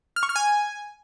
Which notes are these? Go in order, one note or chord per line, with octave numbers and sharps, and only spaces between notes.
F6
C#6
F6
G#5